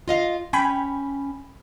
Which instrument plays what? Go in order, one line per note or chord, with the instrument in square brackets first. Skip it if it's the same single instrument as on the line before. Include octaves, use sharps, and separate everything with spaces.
[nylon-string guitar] F4 D#5 F5
[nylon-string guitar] C#4 [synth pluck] G5 G#5 B5